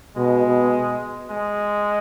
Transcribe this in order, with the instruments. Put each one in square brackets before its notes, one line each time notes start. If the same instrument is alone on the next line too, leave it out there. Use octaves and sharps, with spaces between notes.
[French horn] B2 [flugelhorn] G#3
[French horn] B2
[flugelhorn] G#3